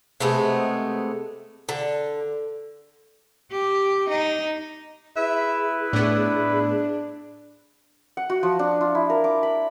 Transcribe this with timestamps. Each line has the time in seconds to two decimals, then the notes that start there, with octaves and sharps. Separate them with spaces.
0.20 C3 G#3 A3 B3
1.69 D3
3.51 G4
4.09 D#4
5.16 E4 G#4 B4 E5
5.93 A2 B3 D4
8.17 F#5
8.30 F#4
8.43 F3
8.59 D4
8.81 F4
8.95 E4
9.10 A#4
9.24 D6
9.43 B5